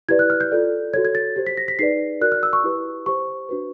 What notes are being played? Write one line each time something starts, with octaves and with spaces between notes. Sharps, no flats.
E4 G4 B4 D5 G#6
F#6
F6
G6
F4 A4 D5
F#4 A4 C#5 G#6
G#6
A6
G4 C5
B6
A#6
B6
D#4 G#4 B4 D5 C7
F#4 A#4 D5 F#6
F6
E6
C#6
E4 G4 B4
G4 C5 C#6
D4 F#4 B4